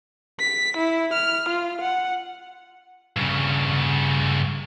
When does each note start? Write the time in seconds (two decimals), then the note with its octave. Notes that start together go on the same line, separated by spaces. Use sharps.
0.40 B6
0.77 E4
1.13 F6
1.49 F4
1.81 F#5
3.16 G2 C#3